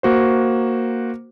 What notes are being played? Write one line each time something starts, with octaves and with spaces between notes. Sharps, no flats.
A#3 F#4 C5